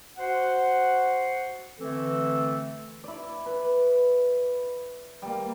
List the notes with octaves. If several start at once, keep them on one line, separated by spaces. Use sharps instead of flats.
F#4 C5 F#5
D3 E3 A3 C4 A4
E4 D5
B4
G3 A#3